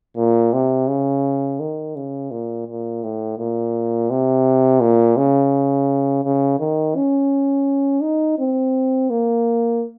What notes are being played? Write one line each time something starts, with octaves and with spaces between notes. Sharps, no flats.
A#2
C3
C#3
D#3
C#3
A#2
A#2
A2
A#2
C3
A#2
C#3
C#3
D#3
C#4
D#4
C4
A#3